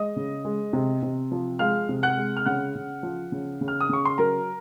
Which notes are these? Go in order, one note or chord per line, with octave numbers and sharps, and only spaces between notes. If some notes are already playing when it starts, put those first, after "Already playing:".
Already playing: G#3 D#5 D#6
C#3
G#3
C3
C3
F3
G#3 F5 F6
C3
F#5 F#6
G#3
F6
C#3 F#5 F#6
C#3
F3
C#3
C#3
F6
D#6
C#3 C#6
C6
F#3 A#4 A#5